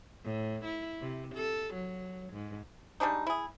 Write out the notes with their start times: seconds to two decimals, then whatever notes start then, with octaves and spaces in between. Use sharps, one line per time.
0.25 A2
0.65 E4
1.02 C3
1.35 A4
1.74 F#3
2.33 G#2
3.00 G3 G#3 D4 D#4
3.27 E4 G#4